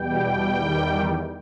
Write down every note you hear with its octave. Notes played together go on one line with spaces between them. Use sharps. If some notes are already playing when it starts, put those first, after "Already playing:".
Already playing: E2 B2 G3 G5
E2 D#3 G3